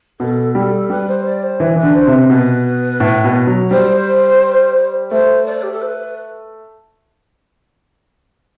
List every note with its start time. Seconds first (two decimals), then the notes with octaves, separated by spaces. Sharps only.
0.20 B2 A4
0.55 G3 A4
0.90 G3 B4
1.08 C5
1.25 D5
1.43 C5
1.60 E3 B4
1.76 E3 B4
1.83 D3
1.95 C5
2.07 C3
2.13 B4
2.30 B2 B4
3.00 A2
3.24 B2
3.47 F#3
3.71 G3 C5
5.11 A3 C5
5.46 D5
5.62 G4
5.72 A4
5.81 C5
5.86 B4